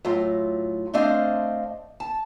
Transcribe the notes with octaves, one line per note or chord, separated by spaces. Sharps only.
A2 F#3 F4
A3 C4 D4 C5 D#5 F5
A5